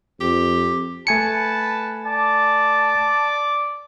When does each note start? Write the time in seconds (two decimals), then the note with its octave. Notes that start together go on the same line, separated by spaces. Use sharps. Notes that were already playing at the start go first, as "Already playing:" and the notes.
0.21 F2 G4
1.07 A3 B4 G#5 A5 C#7
2.06 D5 A5 D6